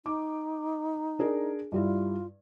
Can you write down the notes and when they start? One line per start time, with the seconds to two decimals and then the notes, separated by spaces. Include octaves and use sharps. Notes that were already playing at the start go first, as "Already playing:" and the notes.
0.06 D#4 D6
1.19 D4 G#4 A#4
1.72 G2 G3 E4 F4